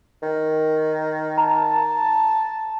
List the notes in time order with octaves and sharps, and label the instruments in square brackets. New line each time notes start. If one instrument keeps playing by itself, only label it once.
[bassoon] D#3
[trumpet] A5 [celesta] A#5